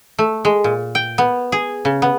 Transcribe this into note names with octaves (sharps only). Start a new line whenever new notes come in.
A3
G#3
A#2
G5
B3
G#4
C#3
B3